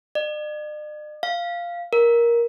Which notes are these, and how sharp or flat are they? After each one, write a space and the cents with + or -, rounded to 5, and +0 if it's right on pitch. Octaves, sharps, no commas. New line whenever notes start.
D5 +45
F5 -5
A#4 +10